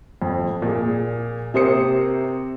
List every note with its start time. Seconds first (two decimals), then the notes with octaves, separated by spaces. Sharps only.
0.22 F2
0.62 A#2 G#4
1.54 C3 A#3 C5 D#6 C#7